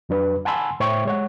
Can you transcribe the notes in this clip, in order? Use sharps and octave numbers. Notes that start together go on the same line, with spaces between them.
F2 F#3 D4 B4
F#5 G#5 A5 B5 C6 E6
A2 C5 C#5 E5 G5 C#6
G#3 C#5 F#5